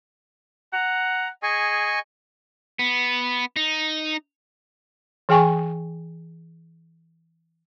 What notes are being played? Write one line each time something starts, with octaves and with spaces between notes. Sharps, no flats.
F#5 A#5
G#4 D#5 G#5 C#6
B3
D#4
E3 G#4 G5 G#5 C#6